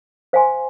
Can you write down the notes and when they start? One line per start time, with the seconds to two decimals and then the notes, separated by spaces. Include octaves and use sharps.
0.33 C5 F5 G#5 C6